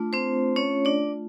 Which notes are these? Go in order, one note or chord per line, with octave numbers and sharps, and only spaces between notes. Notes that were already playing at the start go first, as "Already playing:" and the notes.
Already playing: A3 D4 F4
C4 C5
C#4 C#5
D4 D5